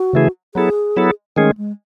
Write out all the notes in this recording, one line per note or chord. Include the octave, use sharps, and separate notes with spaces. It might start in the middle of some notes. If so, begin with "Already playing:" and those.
Already playing: F#4
C#3 E3 A3 E4 G#4
F#3 B3 E4 G#4 A4
F#3 B3 E4 A4
D#3 G#3 A3 C#4 G#4
G#3